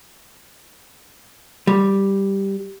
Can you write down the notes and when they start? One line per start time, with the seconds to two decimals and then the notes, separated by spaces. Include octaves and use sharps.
1.67 G3